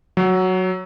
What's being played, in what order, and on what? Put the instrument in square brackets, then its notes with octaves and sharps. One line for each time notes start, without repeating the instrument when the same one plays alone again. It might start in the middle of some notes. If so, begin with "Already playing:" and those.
[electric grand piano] F#3